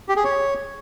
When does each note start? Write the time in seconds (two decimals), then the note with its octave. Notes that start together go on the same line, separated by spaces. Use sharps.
0.09 G4
0.16 G#4
0.24 C#5